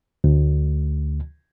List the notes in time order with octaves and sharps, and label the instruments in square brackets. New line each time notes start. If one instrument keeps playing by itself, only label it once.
[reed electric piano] D2